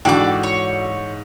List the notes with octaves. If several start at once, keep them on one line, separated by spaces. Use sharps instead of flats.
G#2 D3 E3 D4 F#4 G5 D6
C#5